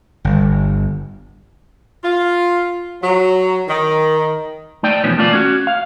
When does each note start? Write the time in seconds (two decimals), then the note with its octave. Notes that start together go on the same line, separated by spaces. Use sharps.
0.25 G1
2.04 F4
3.03 F#3
3.68 D#3
4.83 A3 D#4 D5 G5
5.04 E2 B2 F3 C#4 B4
5.18 A3 A#3 F4 D5
5.33 C#4 F#4
5.67 F5